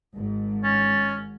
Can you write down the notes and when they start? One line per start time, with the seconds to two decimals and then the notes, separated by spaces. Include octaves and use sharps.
0.15 G#1 G#2
0.64 C#4 A6